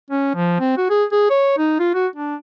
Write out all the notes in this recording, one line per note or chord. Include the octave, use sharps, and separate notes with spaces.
C#4
F3
C4
F#4
G#4
G#4
C#5
D#4
F4
F#4
D4